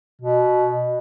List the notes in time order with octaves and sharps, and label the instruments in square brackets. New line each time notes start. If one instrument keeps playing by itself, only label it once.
[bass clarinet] B2